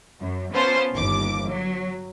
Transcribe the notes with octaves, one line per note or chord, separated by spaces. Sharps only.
F#2
B3 C#4 F4 C5 A5
G1 D#2 D6
F#3